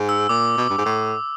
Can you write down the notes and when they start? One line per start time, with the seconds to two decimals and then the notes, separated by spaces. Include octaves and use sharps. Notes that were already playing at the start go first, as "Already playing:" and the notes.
Already playing: G#2
0.09 E6
0.29 A#2 D6
0.57 B2
0.70 G2
0.78 G#2
0.86 A2